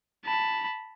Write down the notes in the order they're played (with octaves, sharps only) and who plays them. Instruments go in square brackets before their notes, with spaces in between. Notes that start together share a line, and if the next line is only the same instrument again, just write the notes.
[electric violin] A5 B5